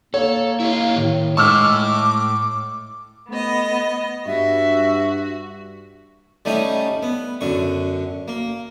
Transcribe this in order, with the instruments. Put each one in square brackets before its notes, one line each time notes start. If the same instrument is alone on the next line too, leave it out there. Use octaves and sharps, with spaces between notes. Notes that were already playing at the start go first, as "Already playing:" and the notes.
[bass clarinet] A#3 [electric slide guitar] A4 [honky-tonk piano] C#5
[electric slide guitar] E4 G4 F5
[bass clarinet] A2 [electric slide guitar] D#3
[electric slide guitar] A2 A5 [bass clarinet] G#3 [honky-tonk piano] C#6 E6 F6 [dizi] D6
[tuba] A3 [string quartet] B3 D#5
[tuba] G2 [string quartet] F#4 [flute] E5
[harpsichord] G3 A3 C#4 D#4
B3
F#2 D3 C#6
A#3